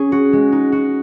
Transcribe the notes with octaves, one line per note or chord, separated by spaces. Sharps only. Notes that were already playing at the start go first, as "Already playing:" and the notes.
Already playing: C#4 G#4
F#4
G#3
D#4
F#4